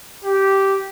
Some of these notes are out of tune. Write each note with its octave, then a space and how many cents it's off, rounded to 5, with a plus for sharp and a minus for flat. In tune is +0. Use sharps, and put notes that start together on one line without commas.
G4 -10